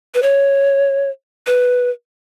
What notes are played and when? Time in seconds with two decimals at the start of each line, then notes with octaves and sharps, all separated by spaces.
0.15 B4
0.23 C#5
1.47 B4